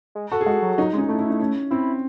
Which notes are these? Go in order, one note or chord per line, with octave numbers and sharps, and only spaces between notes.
G#3
F#4 A4
G#4
G#3 F#4
F#3
F#3 D#4
G#3 C#4
D#4
A3 E4
E4
D#4
C#4
C4 E4